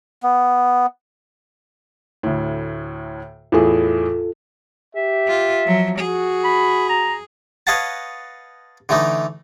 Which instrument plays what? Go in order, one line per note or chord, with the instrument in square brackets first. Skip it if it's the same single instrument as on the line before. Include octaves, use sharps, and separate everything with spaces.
[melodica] B3
[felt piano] D2 A2
[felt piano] E2 A2 G#4 [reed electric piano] F4 A4
[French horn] G4 [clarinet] E5
[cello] F4
F3 F#3
[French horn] F#4 [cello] G#4
[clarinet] B5
A#5
[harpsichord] B4 C#5 D#5 F5 F#5 A5
D3 E3 A3 D#4